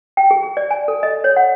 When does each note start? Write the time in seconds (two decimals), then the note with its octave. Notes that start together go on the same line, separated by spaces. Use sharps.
0.17 G5
0.31 G#4
0.43 G#4
0.57 D5
0.71 G#5
0.88 A4
1.03 D#5
1.24 C#5
1.36 F#5